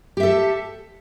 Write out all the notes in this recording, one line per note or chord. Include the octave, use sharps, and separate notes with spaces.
G4 A4 E5